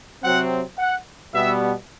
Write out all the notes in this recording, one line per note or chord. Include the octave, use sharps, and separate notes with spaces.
C3 F#3 C4 F#5
F#5
B2 G3 B3 E5